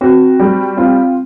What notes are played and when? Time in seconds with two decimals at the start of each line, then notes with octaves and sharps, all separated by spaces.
0.01 C4 F#4
0.39 G3
0.77 C4 F4